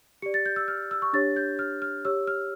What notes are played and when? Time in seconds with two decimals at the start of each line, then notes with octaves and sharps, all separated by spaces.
0.22 G4 D5 C#7
0.34 A6
0.46 G6
0.56 E6
0.68 F6
0.91 E6
1.02 C#6
1.13 D4 G4 C#5 A6
1.36 G6
1.59 F6
1.82 F6
2.05 G4 C#5 E6
2.27 F6